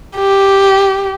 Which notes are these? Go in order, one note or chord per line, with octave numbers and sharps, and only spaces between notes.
G4